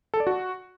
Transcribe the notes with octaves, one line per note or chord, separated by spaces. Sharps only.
A4
D5
F#4